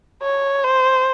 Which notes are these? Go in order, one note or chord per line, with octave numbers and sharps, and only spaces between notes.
C#5
C5